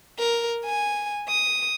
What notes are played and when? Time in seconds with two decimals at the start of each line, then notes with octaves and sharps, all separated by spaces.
0.19 A#4
0.65 G#5
1.29 D#6